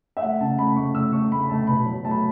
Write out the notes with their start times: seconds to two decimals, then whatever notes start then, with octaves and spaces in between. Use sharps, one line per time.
0.17 E5
0.22 A3 F#5
0.40 C#3 A5
0.58 A3 B5
0.76 A3 C#6
0.94 A3 E6
1.13 A3 C#6
1.31 A3 B5
1.49 A3 A5
1.67 B2 B5
1.85 F#3
2.05 A3 A5
2.11 B5